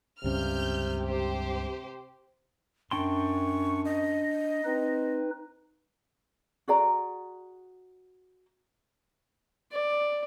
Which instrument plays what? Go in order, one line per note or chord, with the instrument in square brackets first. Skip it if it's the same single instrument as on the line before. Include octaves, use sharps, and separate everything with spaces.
[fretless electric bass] C#2 G2 C#4 [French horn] C3 [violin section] F6 G6
[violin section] G4 C5
[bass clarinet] F#2 [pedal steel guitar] D4 G5 C6 [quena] C#6
[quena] D#5
[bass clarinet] C4 [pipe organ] D#4 B4
[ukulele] F#4 G#4 D5 A#5
[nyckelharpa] D5